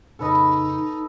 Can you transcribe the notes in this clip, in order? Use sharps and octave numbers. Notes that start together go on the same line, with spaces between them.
F2 A#2 C#3 D#4 A4 B4 D#5